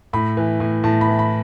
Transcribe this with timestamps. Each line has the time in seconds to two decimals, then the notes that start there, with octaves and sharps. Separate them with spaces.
0.13 A2 B5
0.37 E3
0.60 A2
0.84 A2 A5
1.01 B5
1.08 E3
1.19 B5